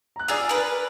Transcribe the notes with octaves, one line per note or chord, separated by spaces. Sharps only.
A#5 F#6
F4 G#4 D5 A#5 E6
A#4 B4